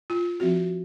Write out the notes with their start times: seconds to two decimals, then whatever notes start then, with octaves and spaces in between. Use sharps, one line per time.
0.10 F4
0.40 F3 C4 F#4